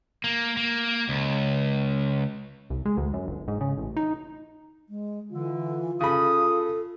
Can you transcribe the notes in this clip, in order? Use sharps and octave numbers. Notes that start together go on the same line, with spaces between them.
A#3
A#3
C#2
C2
G#3
D2
F#2
G1
G#2
C#3
A1
D#4
G#3
D3 E3 F4
C#3 A4 B5 D#6